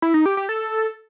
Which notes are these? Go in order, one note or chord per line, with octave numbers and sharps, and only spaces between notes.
E4
D#4
G4
G4
A4